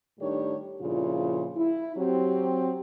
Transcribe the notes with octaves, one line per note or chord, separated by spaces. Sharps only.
A2 D#3 G3 D4 G4 C#5
G2 A#2 C#3 F3 E4 F4
E4
F#3 C4 G4